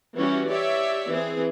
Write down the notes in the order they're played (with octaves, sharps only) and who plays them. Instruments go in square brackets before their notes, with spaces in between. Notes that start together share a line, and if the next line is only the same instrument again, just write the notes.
[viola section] E3 G3 C#4 E4 F#4
G4 C#5 D5 E5
E3 C4 G#4